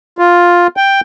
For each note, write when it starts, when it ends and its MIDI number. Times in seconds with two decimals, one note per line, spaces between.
0.18 0.67 65
0.77 1.01 79